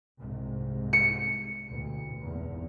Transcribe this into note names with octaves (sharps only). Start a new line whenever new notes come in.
C2 G#2 C3
C#7
A1 D2 B2
G#1 E2